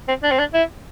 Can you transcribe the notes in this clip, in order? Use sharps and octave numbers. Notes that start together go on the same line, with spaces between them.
C4
D4
C4
D4
E4